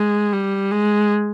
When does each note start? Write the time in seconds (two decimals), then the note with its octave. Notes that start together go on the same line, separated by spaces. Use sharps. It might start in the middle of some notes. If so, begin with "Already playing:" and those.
Already playing: G#3
0.32 G3
0.71 G#3